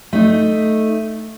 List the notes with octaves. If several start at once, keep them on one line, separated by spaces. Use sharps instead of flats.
A3 D#4